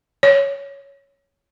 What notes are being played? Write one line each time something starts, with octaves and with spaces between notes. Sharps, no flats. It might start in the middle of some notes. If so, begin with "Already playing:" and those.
C#5